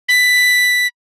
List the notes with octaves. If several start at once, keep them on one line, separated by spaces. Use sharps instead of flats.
B6